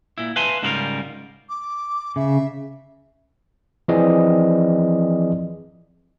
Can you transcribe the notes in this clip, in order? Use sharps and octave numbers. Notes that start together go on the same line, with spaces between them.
A#2 E4
B4 E5 F5 G#5 A5 C6
G#2 C#3 G3 E4 F4 A#4
D6
C#3 E5
E3 F3 C4 G#4 D5 D#5